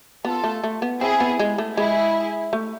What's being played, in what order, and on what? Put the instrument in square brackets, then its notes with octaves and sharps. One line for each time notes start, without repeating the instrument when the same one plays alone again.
[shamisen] B3 [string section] F4 A4
[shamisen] A3
A3
B3
[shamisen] C4 [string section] E4 G#4
[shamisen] B3
G#3
A3
[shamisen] G#3 [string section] E4 G#4
[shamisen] A3